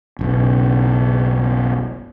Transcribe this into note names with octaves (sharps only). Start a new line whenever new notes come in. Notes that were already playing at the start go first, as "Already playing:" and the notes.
F#1 B1